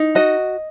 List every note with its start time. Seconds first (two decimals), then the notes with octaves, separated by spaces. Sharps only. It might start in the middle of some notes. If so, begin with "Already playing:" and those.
Already playing: D#4
0.15 F#4 D#5